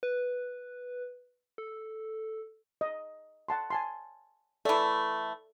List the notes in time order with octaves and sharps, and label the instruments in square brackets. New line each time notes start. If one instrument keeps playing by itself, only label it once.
[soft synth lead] B4
A4
[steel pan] D#5
F#5 A5 C6
G#5 A5 C6
[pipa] E3 A3 [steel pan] A4 D5